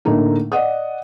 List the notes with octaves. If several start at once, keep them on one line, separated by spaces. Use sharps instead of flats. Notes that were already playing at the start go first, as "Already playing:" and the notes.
A2 D3 A3 A#3 D#4
D5 D#5 F#5 D#6